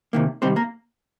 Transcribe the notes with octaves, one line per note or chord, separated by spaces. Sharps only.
C3 D#3 A#3
C3 D#3 G3 C4 C5
A#3 A#4